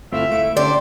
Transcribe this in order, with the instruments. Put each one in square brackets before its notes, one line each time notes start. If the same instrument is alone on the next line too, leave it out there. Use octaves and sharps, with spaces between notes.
[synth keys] G1 E4 F6 [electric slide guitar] A3 C4 F4 [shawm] E5
[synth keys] D2 E4 D7 [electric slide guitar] A3
[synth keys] D3 C#4 D4 [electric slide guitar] G4 [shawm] C5 [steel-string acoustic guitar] D5